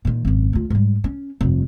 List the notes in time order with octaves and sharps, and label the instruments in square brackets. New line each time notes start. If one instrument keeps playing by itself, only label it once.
[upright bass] A#2 D#3
G#1 F#2
D2 F4
G#2 G3
C#4
F1 G2